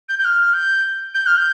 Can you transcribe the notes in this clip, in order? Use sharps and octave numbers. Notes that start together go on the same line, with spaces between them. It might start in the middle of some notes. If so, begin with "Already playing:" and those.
G6
G6
F6
G6
G6
F6
G6